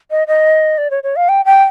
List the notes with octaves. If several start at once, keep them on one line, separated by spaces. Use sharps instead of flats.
D#5
D#5
D5
C#5
C#5
F5
G5
G5